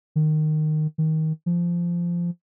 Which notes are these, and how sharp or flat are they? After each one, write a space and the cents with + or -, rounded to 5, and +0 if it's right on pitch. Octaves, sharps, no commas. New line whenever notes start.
D#3 -15
D#3 +20
F3 -15